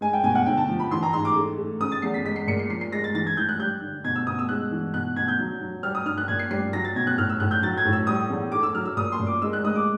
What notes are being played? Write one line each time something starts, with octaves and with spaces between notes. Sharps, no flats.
G#3 G#5
G5
B2 G#5
F#5
D3 G5
A5
F3
B5
E3 C6
A#5
G#2 C6
D6
A3
A3
C#3 D#6
A6
E2 C7
B6
G#3 B6
C7
A#2 C#7
C7
F3 C7
C7
G#3 A#6
A6
E3 A6
G#6
E3 G6
F#6
G3 G6
D3
B2 G#6
E6
B2 D#6
E6
G#3 F#6
E3
B2 F#6
B2 G#6
G6
F#3
F#3
G3 F6
D#6
G2 F6
F#6
A#2 G#6
C7
G3 C7
F#3 A#6
A6
B2 G#6
F#6
A2 F6
E6
A2 F#6
G6
F#3 A6
G#6
A2
E6
G3 D#6
E2
A3 D6
E6
F#3 F6
E6
A#2 D#6
C6
A#2
D6
G#3 E6
F#6
G#3 D#6
D6